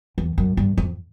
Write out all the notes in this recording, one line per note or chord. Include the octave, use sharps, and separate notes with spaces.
E2
F#2
G2
F2